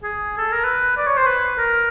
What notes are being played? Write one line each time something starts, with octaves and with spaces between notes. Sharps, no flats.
G#4
A4
A#4
B4
D5
C#5
C5
B4
A#4